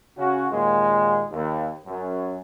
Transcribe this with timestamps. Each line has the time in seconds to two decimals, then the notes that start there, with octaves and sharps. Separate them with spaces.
0.17 C#3 C#4 F#4
0.49 D#2 A#2 G#3
1.31 D#2
1.84 F#2